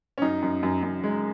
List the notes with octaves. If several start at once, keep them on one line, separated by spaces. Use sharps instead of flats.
C#4
F#2 D#4
F#2
F#2
F#2
G#3